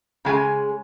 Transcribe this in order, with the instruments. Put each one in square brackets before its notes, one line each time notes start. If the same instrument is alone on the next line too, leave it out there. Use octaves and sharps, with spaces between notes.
[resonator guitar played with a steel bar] C#3 G#3 G#5